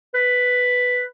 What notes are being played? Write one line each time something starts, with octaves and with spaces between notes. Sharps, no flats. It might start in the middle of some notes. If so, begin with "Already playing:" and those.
B4